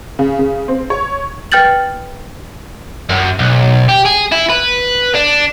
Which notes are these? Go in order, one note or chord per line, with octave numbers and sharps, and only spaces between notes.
C#3
C#3
C4
C#5
B4 G5 F6 G6 A6 F#7
F#2
B1
G4
G#4
E4
B4
D4